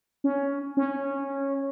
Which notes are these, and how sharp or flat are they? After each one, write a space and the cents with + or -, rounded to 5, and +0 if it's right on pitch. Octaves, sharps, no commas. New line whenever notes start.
C#4 +10
C#4 -10